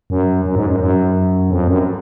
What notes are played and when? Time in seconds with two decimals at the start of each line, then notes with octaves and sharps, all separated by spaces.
0.10 F#2
0.45 F#2
0.56 G#2
0.66 F#2
0.80 F#2
1.50 F2
1.68 F#2